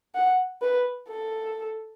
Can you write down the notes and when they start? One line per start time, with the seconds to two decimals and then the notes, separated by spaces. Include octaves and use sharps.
0.15 F#5
0.62 B4
1.09 A4